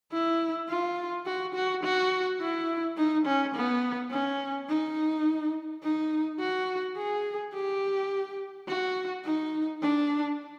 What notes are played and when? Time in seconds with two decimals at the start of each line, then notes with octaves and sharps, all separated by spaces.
0.12 E4
0.69 F4
1.26 F#4
1.55 F#4
1.84 F#4
2.41 E4
2.97 D#4
3.26 C#4
3.55 B3
4.11 C#4
4.69 D#4
5.83 D#4
6.40 F#4
6.97 G#4
7.54 G4
8.69 F#4
9.25 D#4
9.82 D4